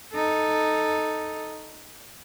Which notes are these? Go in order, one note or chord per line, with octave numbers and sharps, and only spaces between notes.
D#4 A4